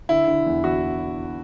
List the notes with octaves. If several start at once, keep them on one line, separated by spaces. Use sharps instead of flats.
D3 E4
D3
E2
E2 F#4